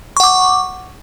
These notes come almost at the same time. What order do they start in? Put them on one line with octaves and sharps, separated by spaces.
C#6 F#5 D6